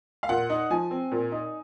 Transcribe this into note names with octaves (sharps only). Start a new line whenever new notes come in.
F5
A#2 F#5
D#4
F3 G#5
C4
A#2
D#4